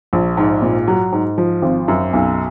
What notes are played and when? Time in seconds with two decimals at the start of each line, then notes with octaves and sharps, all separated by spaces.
0.13 A#1
0.37 G#2
0.62 A#2
0.88 F#3
1.12 G#2
1.38 F3
1.62 G#1
1.88 F#2
2.13 B1